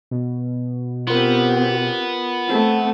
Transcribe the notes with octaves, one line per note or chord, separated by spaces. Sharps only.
B2
B3 C4 F4 G4 A#4
A3 C4